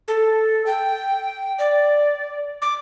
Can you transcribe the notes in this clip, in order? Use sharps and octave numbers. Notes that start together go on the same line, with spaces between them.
A4
G5
D5
D6